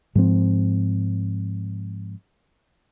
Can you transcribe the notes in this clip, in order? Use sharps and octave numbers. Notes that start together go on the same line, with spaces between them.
G#2 F3 C4